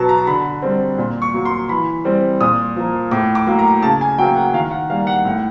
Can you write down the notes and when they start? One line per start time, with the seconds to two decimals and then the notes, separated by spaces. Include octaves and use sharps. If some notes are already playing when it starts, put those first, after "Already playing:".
Already playing: B2 F#3 B3 A5
0.09 A#5
0.27 D3 B5
0.62 G3 C4
0.98 A#2
1.22 C#6
1.34 F#3 A#3
1.45 C6
1.69 E3 B5
2.05 G3 C4
2.40 A#2 D#6
2.76 F3 A#3
3.11 A2 D6
3.35 D6
3.47 F#3 A#3
3.59 A#5
3.82 C#3 A5
4.01 G#5
4.18 F#3 A#3 G5
4.36 F#5
4.54 D#3 F5
4.71 F#5
4.90 G3 A#3 F5
5.07 F#5
5.25 A2